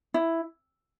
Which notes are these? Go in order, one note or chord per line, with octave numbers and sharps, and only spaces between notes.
E4